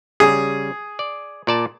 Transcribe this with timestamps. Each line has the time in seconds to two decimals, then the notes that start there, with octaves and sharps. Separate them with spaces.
0.20 C#3 G3 G#4
0.99 D5
1.47 A#2 D5 A5